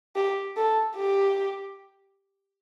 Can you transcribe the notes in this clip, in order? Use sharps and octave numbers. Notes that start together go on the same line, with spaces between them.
G4
A4
G4